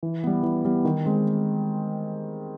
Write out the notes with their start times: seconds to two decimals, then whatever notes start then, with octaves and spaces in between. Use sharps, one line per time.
0.03 E3
0.24 G3 B3
0.43 E3
0.65 G3 B3
0.85 D#3
1.05 G#3 C4